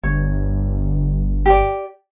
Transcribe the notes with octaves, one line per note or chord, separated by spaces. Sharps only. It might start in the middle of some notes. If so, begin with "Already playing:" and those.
G1 C#5
G4 D5